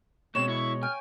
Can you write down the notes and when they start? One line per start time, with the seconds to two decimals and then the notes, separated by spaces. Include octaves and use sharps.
0.35 B2 G#3 A3 C4 C#5 E7
0.49 E4 C#6
0.83 G5 G#5 F6